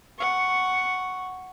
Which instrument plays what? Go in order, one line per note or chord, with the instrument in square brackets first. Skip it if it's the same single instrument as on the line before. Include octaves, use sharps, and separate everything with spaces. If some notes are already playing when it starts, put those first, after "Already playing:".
[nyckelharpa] F#5 C#6